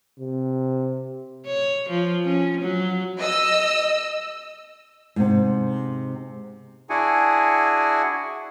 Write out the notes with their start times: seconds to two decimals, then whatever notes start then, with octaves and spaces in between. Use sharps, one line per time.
0.20 C3
1.47 C#5
1.90 F3
2.25 C#4
2.62 F#3
3.20 D#5 E6
5.16 G#2 C3
6.90 D4 E4 F#4 G#4 F#5 G#5